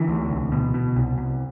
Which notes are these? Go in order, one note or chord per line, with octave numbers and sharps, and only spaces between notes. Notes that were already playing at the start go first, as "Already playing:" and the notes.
Already playing: D3 E3
D2
C2
B2
B2
C2
C2